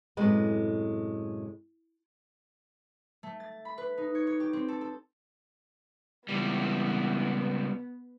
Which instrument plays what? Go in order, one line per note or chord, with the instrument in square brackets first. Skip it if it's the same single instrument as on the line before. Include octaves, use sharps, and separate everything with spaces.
[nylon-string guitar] F#2 A2 C3 G#3 B3 B4
[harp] A3
A6
B5
B4
D#4
C#5
C#5
G4
C4
A4
A4
[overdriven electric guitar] C#2 G3 [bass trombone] E3 [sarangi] B3